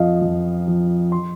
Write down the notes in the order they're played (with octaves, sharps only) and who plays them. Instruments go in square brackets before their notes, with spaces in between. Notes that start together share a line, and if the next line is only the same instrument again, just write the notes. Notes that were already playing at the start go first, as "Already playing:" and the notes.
Already playing: [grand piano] F2 F3 D#5 F5
F2
F3
C6